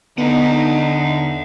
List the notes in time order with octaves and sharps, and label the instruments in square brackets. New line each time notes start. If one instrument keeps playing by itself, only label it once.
[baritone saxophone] D3 [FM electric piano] B3 B6 [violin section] D#4 [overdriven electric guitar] E5 F#5